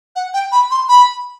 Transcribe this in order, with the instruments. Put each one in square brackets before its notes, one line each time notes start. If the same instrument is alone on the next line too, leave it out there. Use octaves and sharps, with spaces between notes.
[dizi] F#5
G5
B5
C6
B5